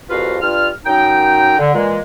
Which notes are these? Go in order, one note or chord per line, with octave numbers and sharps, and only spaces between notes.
C2 F2 F4 F#4 B4 F5
G2 F4 F6
F#2 D#4 G5
D3
A#2 E3 G#3